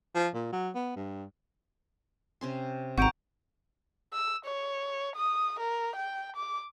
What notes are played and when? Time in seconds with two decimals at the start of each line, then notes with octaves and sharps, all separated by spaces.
0.15 F3
0.35 A#2
0.52 F#3
0.75 B3
0.96 G2
2.41 C3 C#4 C6
2.98 G#1 C4 B4 F#5 A#5 C#6 G6 D7
4.13 E6
4.45 C#5
5.16 D#6
5.60 A#4
5.96 G5
6.37 D6